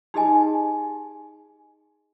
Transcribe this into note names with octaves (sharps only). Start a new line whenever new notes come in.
D#4 G4 G#4 D#5 G#5